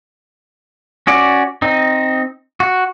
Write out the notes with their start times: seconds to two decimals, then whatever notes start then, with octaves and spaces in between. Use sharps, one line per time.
1.07 C#4 F#4 D5
1.62 C4 D#4
2.60 F#4